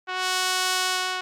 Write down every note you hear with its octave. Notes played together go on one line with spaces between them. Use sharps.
F#4